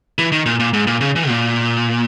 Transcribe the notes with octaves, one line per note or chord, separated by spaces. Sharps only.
E3
D#3
A#2
A#2
G#2
A#2
C#3
E3
A#2